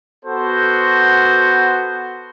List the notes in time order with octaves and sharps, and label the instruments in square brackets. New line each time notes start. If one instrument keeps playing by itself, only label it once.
[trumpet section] B3 F#4 A4 C5